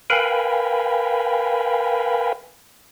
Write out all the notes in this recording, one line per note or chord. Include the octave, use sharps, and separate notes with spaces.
A#4 B4 F5 G5 G#5 B5